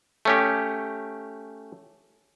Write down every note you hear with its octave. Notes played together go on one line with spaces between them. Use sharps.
A3 C#4 G4